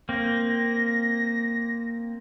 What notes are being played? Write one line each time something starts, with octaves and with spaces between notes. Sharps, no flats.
A#3 C4 A#6